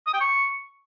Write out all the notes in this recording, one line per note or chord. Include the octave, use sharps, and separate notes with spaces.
D#6
G5
C#6